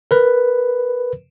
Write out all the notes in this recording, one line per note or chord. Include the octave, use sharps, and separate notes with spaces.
A#4 B4